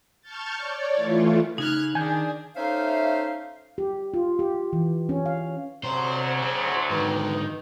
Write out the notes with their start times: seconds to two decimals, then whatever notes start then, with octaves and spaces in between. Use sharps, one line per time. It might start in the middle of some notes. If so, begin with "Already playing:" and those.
0.21 A5 C#6 F6 G6 A6
0.57 C#5 D5
0.94 E3 A3 F4
1.58 C#3 D#4 F6 F#6 G#6
1.95 D#3 D4 G#4 G#5 G6
2.56 A3 C#4 D#4 C5 E5 F5
3.78 G4
4.14 F4
4.39 G4
4.73 E3
5.09 C#4
5.26 F5
5.84 D2 C3 F#3 C5 A#5
6.42 F#4 G#4
6.91 G#2 D3 D#3 B4